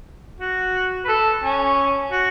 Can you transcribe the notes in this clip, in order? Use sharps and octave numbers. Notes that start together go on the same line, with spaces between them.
F#4
B4
A4
C#4
F#4